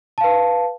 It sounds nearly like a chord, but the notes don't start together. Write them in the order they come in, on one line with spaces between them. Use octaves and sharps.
A5 F5 B4